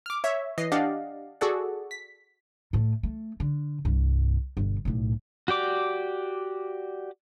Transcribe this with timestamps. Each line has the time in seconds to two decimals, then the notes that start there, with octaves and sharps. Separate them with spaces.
0.06 D6 F6
0.24 C#5 E5
0.58 E3 D#5 C7
0.72 D4 G4 D5 D#5 F5 F#5
1.41 F#4 G#4 A4 D5 F#5
1.91 B6
2.73 A2 A3
3.03 A3
3.40 D3
3.85 C2 G2
4.57 G1 B2
4.85 B1 A2
5.48 F#4 G4 D5 D6